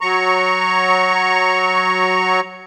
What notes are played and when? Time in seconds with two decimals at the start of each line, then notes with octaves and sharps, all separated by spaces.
0.01 F#3 A#5 C#6